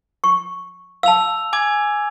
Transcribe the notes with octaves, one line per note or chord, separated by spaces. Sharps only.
C#6
F5 A5 E6 F7
G#5 D6 G#6